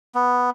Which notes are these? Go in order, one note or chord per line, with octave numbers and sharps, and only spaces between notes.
B3